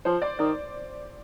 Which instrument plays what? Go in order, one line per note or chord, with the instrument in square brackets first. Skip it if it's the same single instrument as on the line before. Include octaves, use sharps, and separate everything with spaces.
[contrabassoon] F3 [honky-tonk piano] C5
[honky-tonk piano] D5
[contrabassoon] D#3 [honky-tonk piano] D5